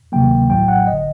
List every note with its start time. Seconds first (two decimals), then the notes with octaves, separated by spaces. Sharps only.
0.12 D2 C3 D#3 F#3 A#3 G5
0.50 A#1 A2 F#3 G5
0.68 F#5
0.87 G1 D3 D#5